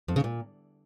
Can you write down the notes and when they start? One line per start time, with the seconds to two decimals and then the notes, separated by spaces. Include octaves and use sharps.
0.08 F2
0.16 C#3
0.24 A#2